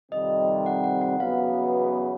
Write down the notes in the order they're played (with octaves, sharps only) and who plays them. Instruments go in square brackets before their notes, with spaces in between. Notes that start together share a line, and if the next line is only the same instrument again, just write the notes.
[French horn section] F2 C3 D#3 G3 C4 [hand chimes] D#5
[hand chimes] F#5
F#5
F#5
[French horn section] E2 C#3 F#3 B3 [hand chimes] F5